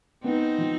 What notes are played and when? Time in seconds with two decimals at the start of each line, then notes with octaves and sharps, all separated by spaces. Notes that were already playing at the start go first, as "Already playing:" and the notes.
0.24 B3 C4 D#4
0.58 F3